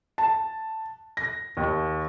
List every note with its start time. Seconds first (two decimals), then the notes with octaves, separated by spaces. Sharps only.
0.18 A5
1.17 A#6
1.57 D#2